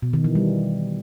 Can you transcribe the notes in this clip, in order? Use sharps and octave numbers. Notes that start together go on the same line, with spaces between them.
B2
D#3
E3
G3